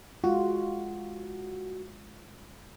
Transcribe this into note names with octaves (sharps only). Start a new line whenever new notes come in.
G#3 F4 F#4